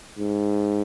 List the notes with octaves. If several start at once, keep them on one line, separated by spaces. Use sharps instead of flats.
G#2